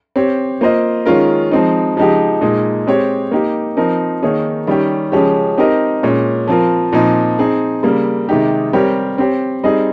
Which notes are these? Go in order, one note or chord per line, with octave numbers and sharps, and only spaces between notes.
C4 G4 C#5
A#3 F4 C5 D#5
D#3 G#3 C#4 F4 A#4
F3 G#3 C4 D#4
C#3 F3 G#3 D#4 G4
A#2 G#3 D#4
G#3 C4 G4 C#5
A#3 D#4 G4
F3 C4 D#4 A#4
D#3 A#3 D#4 G#4 C#5
D#3 G3 C#4 G4
C#3 F3 G#3 C#4 G4
C4 D#4 G4 A#4 D#5
A#2 G#3 C#4
F3 C4 F4 A#4
A#2 F3 C4 D#4
C4 D#4 G#4
C#3 G3 A#3
C3 D#3 G#3 D#4 G4
G3 C4 G4 A#4 C#5
C4 G4 C#5
G3 C4 D#4 G#4 D#5